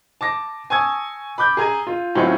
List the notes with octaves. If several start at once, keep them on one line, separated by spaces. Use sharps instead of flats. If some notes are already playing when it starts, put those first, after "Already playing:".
A5 D6 A#6
G#5 A5 C#6 D#6 E6 G#6
B5 D6 G6
G#4 A#5 G#6 D#7
F4
A2 F#3 C4 C#4 E4 F4